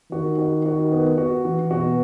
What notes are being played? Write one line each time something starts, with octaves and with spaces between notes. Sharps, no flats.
D#3 F#4
F#4
F#4
B3
F#4
E3
B2 F#4